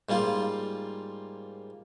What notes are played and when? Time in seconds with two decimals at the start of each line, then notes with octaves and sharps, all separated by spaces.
0.09 G#2 G3 A#3 F4